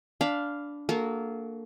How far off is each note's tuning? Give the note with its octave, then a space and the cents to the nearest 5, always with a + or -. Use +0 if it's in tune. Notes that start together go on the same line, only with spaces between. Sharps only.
D4 -10 F5 +0 B5 +0
A#3 -20 F#4 +0 A4 -30